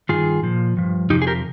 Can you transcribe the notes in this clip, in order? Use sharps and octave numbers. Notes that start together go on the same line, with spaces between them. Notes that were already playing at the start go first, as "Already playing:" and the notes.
G2 D#3 F4 G#4
A#2 F3
G2 F3
F2 C3 F3 D#4 G4
G#4
G4 A#4